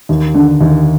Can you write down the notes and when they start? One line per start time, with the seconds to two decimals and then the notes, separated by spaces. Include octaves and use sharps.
0.09 D#2
0.34 D3
0.61 D#2